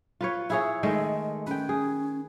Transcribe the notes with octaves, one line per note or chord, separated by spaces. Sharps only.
F4 B4 C#5
E4 G#4 C#5 E5
D#3 G#3 A3 D#5
C#4 B4 G5
G#4